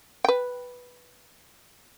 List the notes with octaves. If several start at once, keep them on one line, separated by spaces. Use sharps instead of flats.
B4 G5